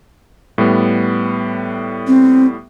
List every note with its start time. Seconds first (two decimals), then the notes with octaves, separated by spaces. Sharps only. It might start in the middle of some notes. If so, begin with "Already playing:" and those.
0.58 A2 G3 B3
2.07 C4